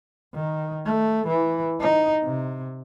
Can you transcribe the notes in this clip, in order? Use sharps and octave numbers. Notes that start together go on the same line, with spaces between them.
D#3
A3
E3
D#4
C3